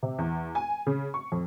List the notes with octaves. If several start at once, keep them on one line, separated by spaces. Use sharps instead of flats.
C3
E2
G#5
C#3
C#6
F2